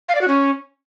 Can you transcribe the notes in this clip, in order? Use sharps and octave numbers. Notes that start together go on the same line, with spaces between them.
F5
D5
F#4
C#4